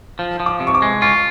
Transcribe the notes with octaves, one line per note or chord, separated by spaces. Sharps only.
F3
F3
D6
C3
C#6
D6
G#3
F4 C#6